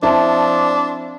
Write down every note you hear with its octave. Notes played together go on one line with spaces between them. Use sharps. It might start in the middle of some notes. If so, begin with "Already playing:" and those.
F3 C4 D4 E4 A5